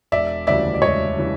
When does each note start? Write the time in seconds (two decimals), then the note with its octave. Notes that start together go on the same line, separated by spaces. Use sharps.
0.12 E1 D5 E5
0.47 D2 C#3 E3 G3 D5 E5
0.74 D5
0.82 E1 C#5 D#5
1.18 C#3 E3 G3